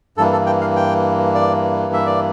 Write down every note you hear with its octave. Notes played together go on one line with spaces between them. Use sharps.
G2 E3 A#3 A4
A4
G5
F5
G5
D5
E5
D5